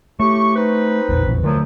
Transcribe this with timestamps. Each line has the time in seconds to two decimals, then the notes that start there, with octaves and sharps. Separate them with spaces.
0.20 A2 A3 G4 C#6
0.56 C4 D#4 B4
1.09 E1 A#1 F2
1.44 A#2 D3 F3 F#3 A3